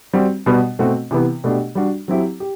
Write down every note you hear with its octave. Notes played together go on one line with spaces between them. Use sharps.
G3 C4 F#4
B2 G3 B3
B2 A3 C4 F#4
C3 E3 B3
B2 A3 D4 G4
G3 D4 F#4
F#3 C4 E4 G4
G4